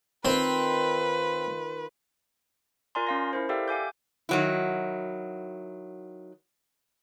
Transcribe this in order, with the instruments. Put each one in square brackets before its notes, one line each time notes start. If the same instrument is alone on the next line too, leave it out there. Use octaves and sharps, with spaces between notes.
[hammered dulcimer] D#3 F4 [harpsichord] C4 [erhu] B4
[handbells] F4 A#4 D5 G#5 A#5 C6
C#4 F5 A#6
E4 A#4 C5
G4 A4 D5 E5 F5 G5
F5 G#5 D6 G6
[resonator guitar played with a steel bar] D#3 F#3 E4